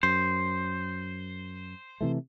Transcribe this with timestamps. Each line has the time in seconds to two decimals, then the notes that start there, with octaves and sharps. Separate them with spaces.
0.03 F#2 C5
2.01 C3 E3 A3